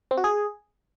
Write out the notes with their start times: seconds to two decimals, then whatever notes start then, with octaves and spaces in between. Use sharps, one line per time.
0.11 C4
0.17 F#4
0.24 G#4